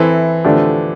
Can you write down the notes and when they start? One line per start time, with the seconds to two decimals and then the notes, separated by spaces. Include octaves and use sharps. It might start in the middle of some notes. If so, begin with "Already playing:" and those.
Already playing: E3 C4 E4 A4 C5
0.45 D3 F3 A3 D4 G4